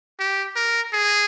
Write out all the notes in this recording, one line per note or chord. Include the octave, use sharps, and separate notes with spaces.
G4
A#4
G#4